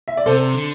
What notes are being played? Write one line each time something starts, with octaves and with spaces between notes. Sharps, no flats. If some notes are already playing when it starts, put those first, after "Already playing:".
E5
D5
C3 A4 C5
D3